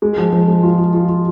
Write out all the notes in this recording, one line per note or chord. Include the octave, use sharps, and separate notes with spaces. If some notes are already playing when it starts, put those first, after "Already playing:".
G#3
F3
F3
G#3
F4
F4
F4
F4